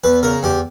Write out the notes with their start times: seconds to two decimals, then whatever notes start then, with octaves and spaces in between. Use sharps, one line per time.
0.04 E2 B4
0.23 C#3 A#4
0.43 E2 G4